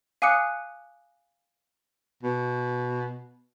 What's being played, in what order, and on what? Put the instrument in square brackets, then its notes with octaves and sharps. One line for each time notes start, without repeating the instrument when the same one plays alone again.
[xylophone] F5 G#5 D6 D#6 F#6 C#7
[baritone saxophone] B2